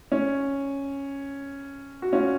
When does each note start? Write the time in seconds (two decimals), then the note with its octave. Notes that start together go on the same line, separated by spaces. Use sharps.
0.12 C#4
2.02 F#4
2.13 C#4 F4